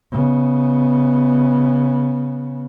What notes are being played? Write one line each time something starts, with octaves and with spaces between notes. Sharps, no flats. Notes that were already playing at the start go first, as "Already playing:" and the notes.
C#3 B3